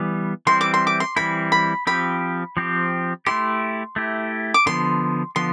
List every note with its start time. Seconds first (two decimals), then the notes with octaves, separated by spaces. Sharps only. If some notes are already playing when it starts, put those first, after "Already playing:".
Already playing: E3 G3 B3
0.47 E3 G3 C4 E4 C6
0.61 D6
0.74 C6
0.87 D6
1.00 C6
1.16 E3 G3 C4 E4 B5
1.52 B5
1.87 F3 C4 G4 B5
2.57 F3 C4 G4
3.26 A3 E4 G4 C6
3.96 A3 E4 G4
4.54 D6
4.66 D3 F3 B3 C6
5.36 D3 F3 B3 C6